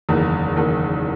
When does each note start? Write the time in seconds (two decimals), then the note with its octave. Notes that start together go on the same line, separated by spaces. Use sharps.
0.09 F#1 E2 D#3
0.56 F#1 E2 D#3